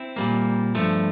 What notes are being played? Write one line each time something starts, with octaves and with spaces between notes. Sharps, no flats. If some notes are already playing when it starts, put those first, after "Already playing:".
Already playing: C4 E4
A#2 G3 A#3
G2 F3 A3